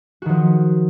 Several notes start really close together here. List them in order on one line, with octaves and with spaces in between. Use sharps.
F#4 D#3 F3